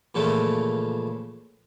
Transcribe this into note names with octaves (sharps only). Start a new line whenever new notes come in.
A#2 C#3 E3 F3 A3